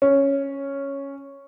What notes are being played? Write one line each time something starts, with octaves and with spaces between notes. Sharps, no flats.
C#4